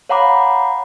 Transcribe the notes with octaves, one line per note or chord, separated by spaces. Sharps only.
C#5 F5 F#5 A#5 B5 D6